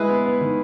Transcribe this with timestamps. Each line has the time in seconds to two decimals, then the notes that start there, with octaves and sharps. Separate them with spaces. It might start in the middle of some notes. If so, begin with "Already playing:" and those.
Already playing: G#3 E4 G#4 B4
0.09 B3
0.25 B3
0.41 D#3